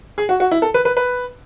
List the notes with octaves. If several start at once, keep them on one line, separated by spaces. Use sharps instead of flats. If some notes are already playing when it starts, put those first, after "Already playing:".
G#4
F#4
F#4
E4
A4
B4
B4
B4